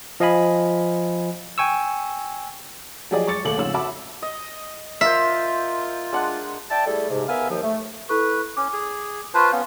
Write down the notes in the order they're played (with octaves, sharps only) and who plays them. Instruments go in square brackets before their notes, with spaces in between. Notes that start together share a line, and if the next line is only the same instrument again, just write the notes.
[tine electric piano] F3 D#5 F5 G#5 B5
G5 G#5 C#6 E6
[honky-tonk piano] F3 F#3 G4 G#4 D5 D#5
G#3 C#6 D6 A6 C#7
D#2 A3 D6 F#7
F2 G#2 C#3 C#4 F4 E6
F#4 E5 A5 B5 D6 E6
[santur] D#5
[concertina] F4 [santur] A#4 C5 [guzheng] E5
[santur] G#3 D4 F#5
[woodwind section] D5 E5 G5 A5
G3 A3 E4 G#4 A4
G#2 C3
B3 A#4 E5 F5 G#5
D#2 F3
A3
[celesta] E4 A4 C#6 [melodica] B4
[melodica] C#4 [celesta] D6
[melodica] G#4
[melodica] F4 B4 C5 [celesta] A5 B5 C#6
[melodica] B3 C#4 [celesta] F5